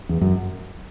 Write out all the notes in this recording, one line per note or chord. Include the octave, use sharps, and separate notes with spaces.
E2
F#2